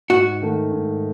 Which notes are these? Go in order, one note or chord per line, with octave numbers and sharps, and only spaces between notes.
G#2 F#4
D#3 A3
G#2